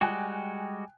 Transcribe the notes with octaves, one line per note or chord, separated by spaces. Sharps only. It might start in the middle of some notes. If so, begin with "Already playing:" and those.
G3 G#3 F#4 G5 G#5 F#6